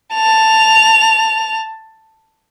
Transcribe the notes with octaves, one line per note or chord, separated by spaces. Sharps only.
A5 F7